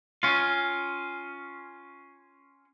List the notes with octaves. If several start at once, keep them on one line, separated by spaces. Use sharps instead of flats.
C#4 F4